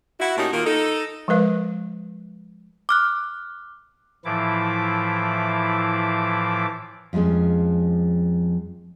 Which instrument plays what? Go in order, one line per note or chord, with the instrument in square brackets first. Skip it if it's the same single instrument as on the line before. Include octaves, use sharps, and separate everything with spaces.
[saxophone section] E4 F#4
A#2 A3 C#4 D#4 F#4 G4
D#3 A#3 F4
D#4 A4
[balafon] F3 G#3 A#4 B4 F5
[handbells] D6 F6 F#6
[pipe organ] A2 E3 F3 E4 D6
[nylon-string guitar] F2 F3 G3 G#3 C#4